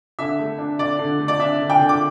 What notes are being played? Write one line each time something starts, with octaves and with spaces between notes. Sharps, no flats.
D3 E5
A3
D4
D3 D5
D3
A3
D5
D4 E5
D3
G5
D3
D6